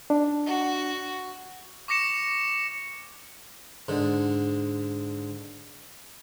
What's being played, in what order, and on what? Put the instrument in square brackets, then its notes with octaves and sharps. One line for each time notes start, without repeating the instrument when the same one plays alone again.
[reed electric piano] D4
[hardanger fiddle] F#4
[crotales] C#6 D6 A#6 C#7 E7
[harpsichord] G#2 D3